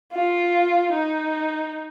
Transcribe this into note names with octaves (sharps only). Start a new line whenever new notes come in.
F4
D#4